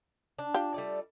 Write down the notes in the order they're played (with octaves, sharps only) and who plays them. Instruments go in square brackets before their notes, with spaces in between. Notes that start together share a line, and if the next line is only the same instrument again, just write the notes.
[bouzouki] D4
[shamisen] F4 G4
[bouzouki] G3 A3 D5